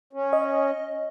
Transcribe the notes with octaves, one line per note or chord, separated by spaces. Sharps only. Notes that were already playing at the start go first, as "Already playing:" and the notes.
C#4
D#5